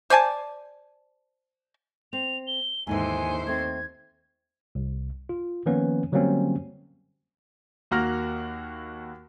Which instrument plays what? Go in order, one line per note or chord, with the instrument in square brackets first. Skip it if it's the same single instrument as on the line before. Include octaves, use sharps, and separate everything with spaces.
[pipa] C5 D5 G#5 A5
[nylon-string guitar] C4 [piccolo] F7
[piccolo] G7
[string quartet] D#2 C5 [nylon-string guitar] G#2 D3 E3 [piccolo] G#5
[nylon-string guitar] A3 C4 [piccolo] G#6
[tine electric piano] C2
F4
D#3 F3 A#3 B3 C#4 B4
D3 F#3 G3 A#3 C4 C#4
[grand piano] D#2 A#3 F#4 F6 A#6